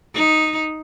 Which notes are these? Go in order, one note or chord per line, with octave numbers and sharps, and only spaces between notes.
D#4